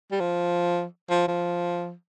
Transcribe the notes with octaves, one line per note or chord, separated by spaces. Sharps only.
G3
F3
F3
F3